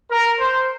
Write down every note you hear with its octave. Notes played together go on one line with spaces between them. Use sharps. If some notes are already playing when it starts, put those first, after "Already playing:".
A#4
C5